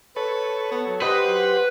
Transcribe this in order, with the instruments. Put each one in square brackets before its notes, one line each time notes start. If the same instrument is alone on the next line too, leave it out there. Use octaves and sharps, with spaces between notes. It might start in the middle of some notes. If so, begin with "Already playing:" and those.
[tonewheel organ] A4 C#5 [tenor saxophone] B4
[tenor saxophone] B3
F#3
[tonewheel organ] G4 C5 F#5 [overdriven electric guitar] B4 [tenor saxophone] D#5
[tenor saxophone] F#3